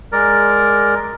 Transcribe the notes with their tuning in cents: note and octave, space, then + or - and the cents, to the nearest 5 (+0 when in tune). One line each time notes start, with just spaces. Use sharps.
G#3 +0 A#4 +0 D5 +0